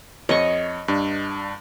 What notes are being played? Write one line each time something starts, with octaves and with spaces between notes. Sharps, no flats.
F2 C#5 D#5 C#6
G2 D4